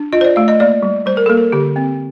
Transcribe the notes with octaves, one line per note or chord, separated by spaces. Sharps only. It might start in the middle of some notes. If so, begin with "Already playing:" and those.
Already playing: D4
F4 D#5
C5
D5
A3 F5
D#5
A#3 D5
G3
G3 C5
A#4
A#3 A4
A#4
D3 G4
C4